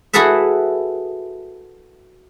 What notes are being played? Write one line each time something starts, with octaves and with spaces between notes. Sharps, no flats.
E4 F#4 G#4 A4 B4 E5